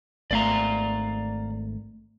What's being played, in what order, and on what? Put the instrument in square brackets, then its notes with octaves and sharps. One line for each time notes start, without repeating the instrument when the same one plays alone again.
[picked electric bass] G#1 A3 [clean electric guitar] D5 F5 A#5